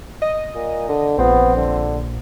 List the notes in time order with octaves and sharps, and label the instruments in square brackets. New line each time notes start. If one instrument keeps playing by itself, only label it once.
[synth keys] D#5
[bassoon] A#2
D3
[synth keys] A#1 [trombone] B3 [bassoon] C4
[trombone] D3